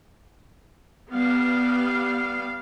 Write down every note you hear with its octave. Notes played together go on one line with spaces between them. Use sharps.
G3 B3 F5